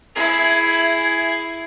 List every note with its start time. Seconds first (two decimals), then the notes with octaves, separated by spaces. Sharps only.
0.15 E4 G#4